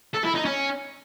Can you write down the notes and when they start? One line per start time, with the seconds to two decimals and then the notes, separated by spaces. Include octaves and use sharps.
0.14 A4
0.24 E4
0.35 D#4
0.45 C#4